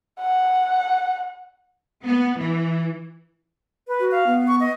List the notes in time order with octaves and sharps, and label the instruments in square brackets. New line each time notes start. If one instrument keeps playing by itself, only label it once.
[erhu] F#5
[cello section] B3
E3
[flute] B4
[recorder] F#4
[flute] F5
[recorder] B3
[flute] C#6
D#5